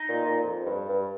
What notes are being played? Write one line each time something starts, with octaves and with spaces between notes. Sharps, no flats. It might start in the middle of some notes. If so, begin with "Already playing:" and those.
Already playing: D#4
A#2
A#2
F2
G2
G2